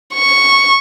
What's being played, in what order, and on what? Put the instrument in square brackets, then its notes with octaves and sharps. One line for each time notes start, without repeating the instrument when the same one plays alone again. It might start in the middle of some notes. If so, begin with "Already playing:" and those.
[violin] C#6